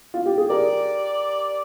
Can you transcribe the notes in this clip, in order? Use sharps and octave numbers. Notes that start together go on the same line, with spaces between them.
F4
G4
G#4
G4 A#4 D5